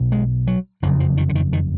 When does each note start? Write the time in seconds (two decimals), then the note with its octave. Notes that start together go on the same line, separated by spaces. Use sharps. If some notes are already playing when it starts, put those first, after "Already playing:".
Already playing: B1 B2
0.12 G#3
0.47 F#3
0.82 F#1 F2 C#3 F3
1.00 F3
1.17 D#3
1.29 D3
1.35 D#3
1.53 D#3